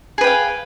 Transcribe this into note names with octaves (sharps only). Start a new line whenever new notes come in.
G#4 B4 F5 G5